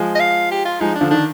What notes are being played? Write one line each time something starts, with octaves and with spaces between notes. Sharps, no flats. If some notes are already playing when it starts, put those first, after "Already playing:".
Already playing: F3 G#3
D#5
F5
G4
F4
F3 G#3 D#4
D4
D3 F3
D#3 D4